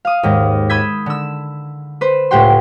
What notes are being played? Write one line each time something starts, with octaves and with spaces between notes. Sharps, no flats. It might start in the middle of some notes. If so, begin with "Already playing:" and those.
F5 D#6
D#2 G#2
B5 D#6 E6 G6 G#6 B6
D3 E6
B4 C5
C#2 A2 G4 F#5 G5 C6